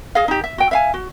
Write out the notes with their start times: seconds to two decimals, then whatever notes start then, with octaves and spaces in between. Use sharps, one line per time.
0.15 G#4 D#5 F5
0.28 D#4 G4
0.44 E5
0.58 F#4 G5
0.71 E5 F5 G#5
0.94 F#4